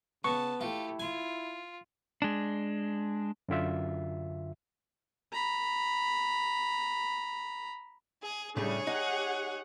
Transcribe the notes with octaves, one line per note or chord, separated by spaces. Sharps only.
C#3 B3 A5 C#6
A3 E4 F4 G4
F4 G#5
G#3 D4
F#2 D3 F4 E5
A#5 B5
G#4
A2 C#3 G3 A3 D4 G#4 C#5
D#4 G4 F#5